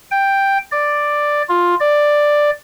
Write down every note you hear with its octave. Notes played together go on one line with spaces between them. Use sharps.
G5
D5
F4
D5